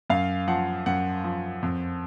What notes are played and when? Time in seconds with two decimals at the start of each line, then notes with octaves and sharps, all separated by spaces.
0.10 F#2 F5
0.48 F3 F#5
0.86 F#2 F#5
1.24 F3
1.63 F2